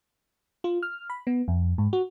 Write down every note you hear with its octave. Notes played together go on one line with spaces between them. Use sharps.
F4
F6
B5
B3
F2
G#2
F#4